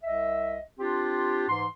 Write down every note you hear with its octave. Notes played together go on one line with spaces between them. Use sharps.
C2 D#5 E5
C4 D4 F4 G4
G#2 E3 C6